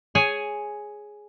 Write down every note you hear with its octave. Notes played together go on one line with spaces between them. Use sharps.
G#4 C#5 G#5